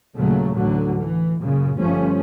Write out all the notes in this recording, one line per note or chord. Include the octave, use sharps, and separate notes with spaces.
D#2 A#2 C#3 F#3 A3
A1 D2 D3 F#3
E3
F#2 A#2 C#3
G1 G2 F3 A3 C#4